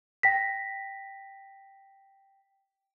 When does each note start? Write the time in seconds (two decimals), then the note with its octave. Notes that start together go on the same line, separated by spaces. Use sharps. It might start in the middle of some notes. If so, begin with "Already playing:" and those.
0.23 G5 A#6 B6